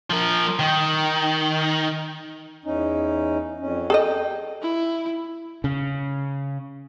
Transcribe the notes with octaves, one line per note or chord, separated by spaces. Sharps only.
F3 A#4
D#3
E2 C#4 D#4
F2 C#4
G#4 A4 D#5 G5
E4
C#3